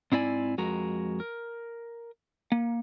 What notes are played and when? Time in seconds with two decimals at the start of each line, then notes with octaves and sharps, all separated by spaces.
0.12 G#2 C4 E4 D5 G#5
0.58 F2 G#3 F#4 A#4 A#5
1.20 A#4
2.52 A#3